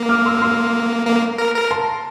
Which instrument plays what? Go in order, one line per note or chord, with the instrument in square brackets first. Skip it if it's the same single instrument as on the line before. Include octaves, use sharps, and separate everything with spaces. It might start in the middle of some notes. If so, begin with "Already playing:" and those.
Already playing: [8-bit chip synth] A#3
[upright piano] D6 F6
C6 E6
F6
C6 E6
[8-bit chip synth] A#3
A#4
A#4
[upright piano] A5 C6